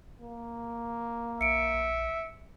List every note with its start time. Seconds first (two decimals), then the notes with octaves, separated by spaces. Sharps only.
0.21 A#3
1.41 A#1 E5 C#7 D7